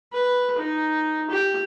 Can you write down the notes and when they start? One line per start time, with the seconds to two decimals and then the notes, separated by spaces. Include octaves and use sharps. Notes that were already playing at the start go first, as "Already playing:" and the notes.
0.13 B4
0.58 D#4
1.30 G4